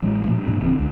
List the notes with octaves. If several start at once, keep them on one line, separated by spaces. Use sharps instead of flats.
A1 F#3 G#3
A#2 F3 A3 A#3
G2
G2 C3 F#3 A#3
D1 C#3 E3 C4
C#2 D3